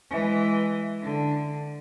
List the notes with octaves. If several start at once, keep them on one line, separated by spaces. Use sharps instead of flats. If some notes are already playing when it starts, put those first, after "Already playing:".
E3 G#3
D3